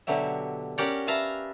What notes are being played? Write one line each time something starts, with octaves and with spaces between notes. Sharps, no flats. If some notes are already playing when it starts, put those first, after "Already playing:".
B2 D3 F#3 G4 E5
C#4 G4 A#4 D5 F#5 G5
B4 E5 F5 A5 A#5